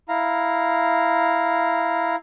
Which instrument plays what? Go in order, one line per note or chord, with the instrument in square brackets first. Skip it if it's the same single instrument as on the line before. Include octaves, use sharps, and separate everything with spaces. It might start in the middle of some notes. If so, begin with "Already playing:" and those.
[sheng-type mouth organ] E4 F5 A#5